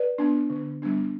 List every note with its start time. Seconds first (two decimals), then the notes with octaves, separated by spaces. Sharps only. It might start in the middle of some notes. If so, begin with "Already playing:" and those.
Already playing: B4 D5
0.18 B3 D4
0.50 D3
0.82 G3 B3 D4